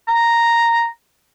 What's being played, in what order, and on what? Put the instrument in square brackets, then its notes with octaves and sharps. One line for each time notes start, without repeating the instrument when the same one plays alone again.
[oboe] A#5